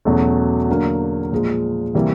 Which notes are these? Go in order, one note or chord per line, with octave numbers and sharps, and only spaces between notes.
E2 B2 F#3 A3 C#4
D3 F#3 A#3
A#2 F3 G#3
C3 E3 G3 A#3